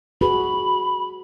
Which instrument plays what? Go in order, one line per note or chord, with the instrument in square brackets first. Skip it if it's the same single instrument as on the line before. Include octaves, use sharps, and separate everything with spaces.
[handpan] F#4 G#4 B4 [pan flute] B5